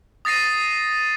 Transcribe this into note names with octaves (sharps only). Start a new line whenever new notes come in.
D#6 A6 A#6 C7 D#7